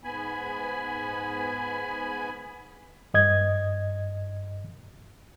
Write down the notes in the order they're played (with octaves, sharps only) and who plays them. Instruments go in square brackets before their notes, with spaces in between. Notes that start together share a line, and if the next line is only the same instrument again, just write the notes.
[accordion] G#2 B3 G#5 B5
[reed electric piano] G2 D#5 G#6